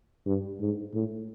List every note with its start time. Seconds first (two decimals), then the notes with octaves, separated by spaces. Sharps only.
0.26 G2
0.60 G#2
0.94 A2